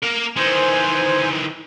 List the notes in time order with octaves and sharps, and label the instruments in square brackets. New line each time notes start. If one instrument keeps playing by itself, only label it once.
[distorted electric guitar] A#3 A#4
[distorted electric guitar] D#3 E3 [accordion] C5 G#5